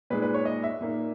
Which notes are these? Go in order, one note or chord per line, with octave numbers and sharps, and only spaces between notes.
A#2 G#3 D#4 B4
B4
C#5
D#5
E5
A#2 A#3 D#4